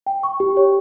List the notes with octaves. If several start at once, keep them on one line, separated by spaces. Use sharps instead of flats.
G5
C#6
G4
C#5